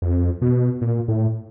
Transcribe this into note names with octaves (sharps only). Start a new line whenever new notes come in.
F2
B2
A#2
A2